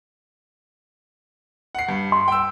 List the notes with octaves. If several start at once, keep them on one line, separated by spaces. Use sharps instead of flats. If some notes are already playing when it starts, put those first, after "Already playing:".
F#5 C7
G2
C6
G5 E6